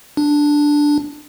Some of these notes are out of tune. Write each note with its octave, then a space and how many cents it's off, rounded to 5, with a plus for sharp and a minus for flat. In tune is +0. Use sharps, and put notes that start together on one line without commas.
D4 +0